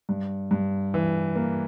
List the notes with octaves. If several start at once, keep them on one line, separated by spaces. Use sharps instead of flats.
G2
G2
E3
A#3